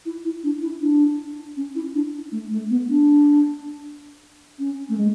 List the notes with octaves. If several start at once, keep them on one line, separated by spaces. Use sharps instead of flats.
E4
E4
D4
E4
D4
C#4
E4
D4
A3
A3
B3
D4
C#4
A3
G#3